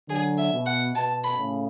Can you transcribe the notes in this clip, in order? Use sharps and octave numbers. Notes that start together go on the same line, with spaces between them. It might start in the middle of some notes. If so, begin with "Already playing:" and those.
D3 F#3 G#4
E5
B2
F#5
B2 A5
B5
A2 C#3